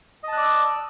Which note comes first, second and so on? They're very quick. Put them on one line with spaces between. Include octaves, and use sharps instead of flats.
D#5 A5 F#6 D5 E6